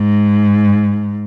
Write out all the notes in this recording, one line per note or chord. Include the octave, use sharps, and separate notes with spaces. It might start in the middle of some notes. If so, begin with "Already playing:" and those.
Already playing: G#2